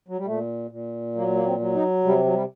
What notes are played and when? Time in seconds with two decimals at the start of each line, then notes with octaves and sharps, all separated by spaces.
0.08 F#3
0.17 G3
0.26 A#2 A3
0.71 A#2
1.15 F#3 A#3
1.35 A#3
1.45 C4
1.59 F#3
1.75 D#4
2.04 C3 G3
2.24 F#3
2.34 G3